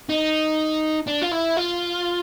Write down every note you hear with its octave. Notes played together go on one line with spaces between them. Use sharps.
D#4
D4
F4
E4
F4